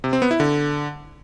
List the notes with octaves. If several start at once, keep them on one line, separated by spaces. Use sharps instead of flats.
C3
C4
B3
E4
D3